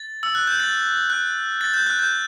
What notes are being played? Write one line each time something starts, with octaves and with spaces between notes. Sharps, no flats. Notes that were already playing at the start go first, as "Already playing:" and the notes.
Already playing: A6
E6
F#6
G6
A6
F#6
A6
G6
F#6
G6